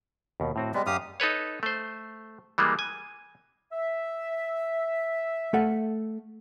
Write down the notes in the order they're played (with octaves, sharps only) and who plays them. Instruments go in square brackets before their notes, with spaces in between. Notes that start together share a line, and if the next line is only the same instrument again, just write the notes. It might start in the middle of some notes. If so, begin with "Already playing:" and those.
[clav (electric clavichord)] D#2 B2
A2 C4 F#4
[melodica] G3 G#3 [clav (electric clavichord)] B3
[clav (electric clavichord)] F#2 [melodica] G4 F5 D#6
[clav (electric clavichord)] D#4 A4 B4 C#5
A3 C5
E3 G3 G#3 A#3
G#5
[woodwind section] E5
[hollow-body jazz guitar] A3 A4 F#5